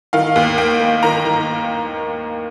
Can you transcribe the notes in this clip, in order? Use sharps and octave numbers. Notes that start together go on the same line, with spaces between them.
D#3 F5
D#2
A#3 G5
A#3
D#3 A#5
D#3